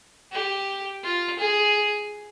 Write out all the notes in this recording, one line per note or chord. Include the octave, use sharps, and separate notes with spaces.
G4
F4
G#4